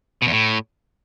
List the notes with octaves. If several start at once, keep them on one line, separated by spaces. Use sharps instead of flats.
B2
E2
A2